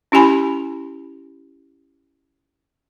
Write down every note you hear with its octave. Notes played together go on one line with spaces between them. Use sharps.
C#4 E4 G4 G#5 B5